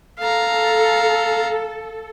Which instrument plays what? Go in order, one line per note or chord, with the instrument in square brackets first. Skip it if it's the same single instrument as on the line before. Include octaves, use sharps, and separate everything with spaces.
[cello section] A4 [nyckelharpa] F5 A#5